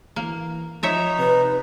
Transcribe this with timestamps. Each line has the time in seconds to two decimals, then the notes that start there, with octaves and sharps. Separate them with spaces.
0.16 E3 A#3
0.83 F3 D#4 C#5 E5 A#5
1.18 C3 B4